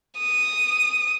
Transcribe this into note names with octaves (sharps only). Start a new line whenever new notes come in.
D#6